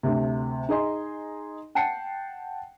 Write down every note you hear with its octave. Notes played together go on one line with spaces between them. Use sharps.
D2 C3
D#4 G#4 D#5 C6
F#5 G5 A5 C7 C#7